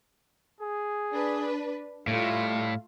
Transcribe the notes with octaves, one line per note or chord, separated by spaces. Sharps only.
G#4
D4 B4
A2 G3 A3 F4 F5